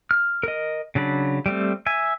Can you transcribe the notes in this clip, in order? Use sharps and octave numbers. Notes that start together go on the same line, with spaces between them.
F6
A#4 D#5
C#3 F#3 D4 B5
G3 A3 C4
E5 G#5